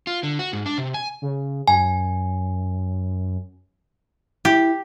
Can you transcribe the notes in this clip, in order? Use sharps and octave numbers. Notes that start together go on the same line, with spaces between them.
F4
D3
F#4
G#2
D4
C3
G#5
C#3
F#2 G#5
E4 G4